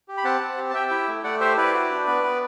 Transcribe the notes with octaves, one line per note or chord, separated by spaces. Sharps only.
G4
B5
C4 F#5 A5
C4
G4
A5
G4 E5 G5
E4
A3
A3 D5 F#5
G4 C5 E5
E4 B4 D5
F#4
D4
B3
B3